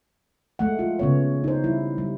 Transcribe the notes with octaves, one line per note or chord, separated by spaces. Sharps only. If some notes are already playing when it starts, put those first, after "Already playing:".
G#3 A3 F#5
F4
C#3 B3 C#5
D#4 C5
G3 E4
G3